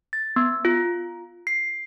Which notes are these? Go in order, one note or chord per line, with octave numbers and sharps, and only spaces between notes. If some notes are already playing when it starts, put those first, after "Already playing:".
A6
B3
F4
C7